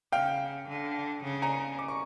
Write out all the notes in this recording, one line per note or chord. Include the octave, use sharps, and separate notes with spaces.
C#3 F5 G5
D3
C#3
G#5 A#5
D6
C#6